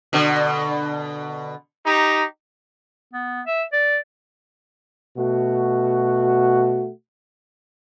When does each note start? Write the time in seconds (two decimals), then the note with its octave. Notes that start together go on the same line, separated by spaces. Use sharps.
0.13 B2 D3
1.86 D#4 G4 A#5
3.13 B3
3.46 E5
3.73 D5
5.17 B2 A3 F#4